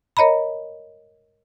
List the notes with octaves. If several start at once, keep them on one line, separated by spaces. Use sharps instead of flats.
A#4 C#5 D#5 A#5 B5